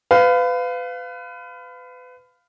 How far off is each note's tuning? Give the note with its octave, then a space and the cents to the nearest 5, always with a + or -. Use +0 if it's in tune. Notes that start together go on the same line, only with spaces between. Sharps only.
B4 +30 F5 +0